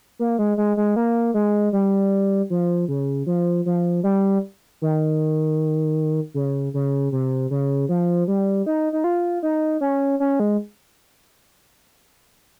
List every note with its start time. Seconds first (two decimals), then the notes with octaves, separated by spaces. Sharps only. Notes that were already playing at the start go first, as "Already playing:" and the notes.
0.19 A#3
0.39 G#3
0.57 G#3
0.77 G#3
0.96 A#3
1.34 G#3
1.73 G3
2.50 F3
2.88 C#3
3.26 F3
3.66 F3
4.04 G3
4.82 D#3
6.34 C#3
6.74 C#3
7.12 C3
7.51 C#3
7.89 F3
8.28 G3
8.66 D#4
8.93 D#4
9.04 F4
9.43 D#4
9.81 C#4
10.20 C#4
10.40 G#3